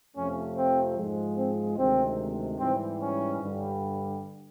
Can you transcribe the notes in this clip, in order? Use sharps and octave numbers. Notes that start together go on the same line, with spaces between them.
F2 C3 F3 A3 C#4
C4
G#2 F3 G#3
C4
D2 C3 D#3 G#3 C4
G#2 E3 G3 C4
C#4
G2 D3 G3